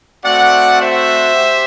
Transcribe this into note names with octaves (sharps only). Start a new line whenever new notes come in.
A3 C4 F#4 D5 F#5
C5 E5
G4